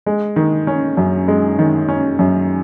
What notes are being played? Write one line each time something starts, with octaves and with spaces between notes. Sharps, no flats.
G#3
D#3
C#4
F#2
G#3
D#3
C#4
F#2